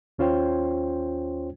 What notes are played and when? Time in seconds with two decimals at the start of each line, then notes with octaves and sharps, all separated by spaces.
0.19 D#2 C#4 F4 C5 C#5 G5